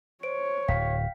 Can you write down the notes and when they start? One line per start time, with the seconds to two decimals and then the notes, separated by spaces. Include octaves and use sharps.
0.23 C5 C#5 D7
0.68 D1 F5 G5 B6